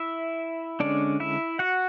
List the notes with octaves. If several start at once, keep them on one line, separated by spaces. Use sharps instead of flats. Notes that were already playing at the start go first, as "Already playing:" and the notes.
Already playing: E4 E5
D3 G#3 C#4 D4 D5
E4 E5
F#4 F#5